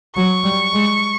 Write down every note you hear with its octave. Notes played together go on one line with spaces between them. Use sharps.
F#3 C#6
G3
G#3